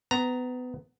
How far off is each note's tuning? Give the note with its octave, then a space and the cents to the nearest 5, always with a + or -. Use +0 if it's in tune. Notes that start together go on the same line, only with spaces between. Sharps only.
B3 +25 A#5 +0